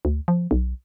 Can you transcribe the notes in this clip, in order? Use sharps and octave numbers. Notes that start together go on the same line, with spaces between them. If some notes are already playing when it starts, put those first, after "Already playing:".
D2
F3
B1